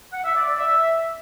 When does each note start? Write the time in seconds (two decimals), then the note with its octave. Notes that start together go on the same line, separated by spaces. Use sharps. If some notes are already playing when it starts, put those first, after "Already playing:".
0.13 F#5
0.24 E5
0.35 D5
0.47 D5
0.58 E5